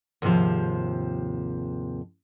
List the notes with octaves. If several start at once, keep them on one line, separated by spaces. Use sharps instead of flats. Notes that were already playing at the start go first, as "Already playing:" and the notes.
D#2 G#2 C3 F3